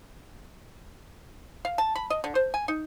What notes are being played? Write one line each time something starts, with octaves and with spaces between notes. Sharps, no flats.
F5
A5
B5
D#5
D3
C5
G#5
D#4